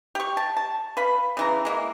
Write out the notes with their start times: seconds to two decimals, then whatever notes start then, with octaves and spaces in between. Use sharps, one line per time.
0.15 G4 C#6
0.37 A5
0.57 A5
0.97 B4 F5 B5
1.37 C#3 E3 A#5
1.65 G#3 A#3 E4